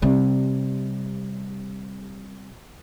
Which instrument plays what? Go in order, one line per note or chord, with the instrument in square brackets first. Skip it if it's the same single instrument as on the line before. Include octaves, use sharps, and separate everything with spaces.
[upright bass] C3 G3